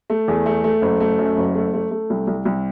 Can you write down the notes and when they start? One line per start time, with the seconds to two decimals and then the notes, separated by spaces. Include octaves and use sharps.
0.10 A3
0.28 E2
0.46 A3
0.64 A3
0.82 F#1
1.00 A3
1.18 F#2
1.37 F#1
1.55 A3
1.74 A3
1.91 A3
2.10 C2
2.27 C2
2.45 C2